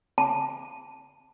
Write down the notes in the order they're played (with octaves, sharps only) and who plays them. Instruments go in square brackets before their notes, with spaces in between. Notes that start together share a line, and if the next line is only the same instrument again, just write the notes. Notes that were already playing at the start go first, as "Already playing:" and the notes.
[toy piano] A5